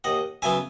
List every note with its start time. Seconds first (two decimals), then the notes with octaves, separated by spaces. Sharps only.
0.04 D#2 D#5 F#5
0.42 C#3 F#3 B3 E5 G#5